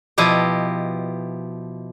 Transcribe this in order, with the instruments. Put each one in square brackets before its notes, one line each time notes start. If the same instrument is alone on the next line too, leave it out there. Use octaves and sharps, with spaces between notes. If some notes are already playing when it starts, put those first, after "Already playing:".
[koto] B2 F3 E4 G4 D#5